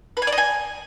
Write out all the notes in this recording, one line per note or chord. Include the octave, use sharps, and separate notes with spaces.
B4
G#5
D5
D#5
G#5